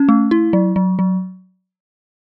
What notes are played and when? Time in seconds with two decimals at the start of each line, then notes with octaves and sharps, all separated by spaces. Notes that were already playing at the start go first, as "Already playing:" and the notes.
Already playing: C#4
0.09 A3
0.31 E4
0.53 F#3
0.76 F#3
0.99 F#3